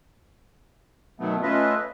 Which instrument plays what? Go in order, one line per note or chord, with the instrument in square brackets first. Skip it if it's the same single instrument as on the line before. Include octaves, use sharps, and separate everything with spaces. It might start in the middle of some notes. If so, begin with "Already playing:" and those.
[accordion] B2 D#3 F#3 A3 B3
A3 C#4 F4 B4 D#5 E5